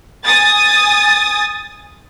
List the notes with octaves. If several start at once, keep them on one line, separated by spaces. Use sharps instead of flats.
G#5 D#6 A6